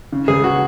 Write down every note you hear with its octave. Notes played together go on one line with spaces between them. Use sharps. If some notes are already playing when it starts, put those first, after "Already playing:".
C#3
C#2 G#4
F#4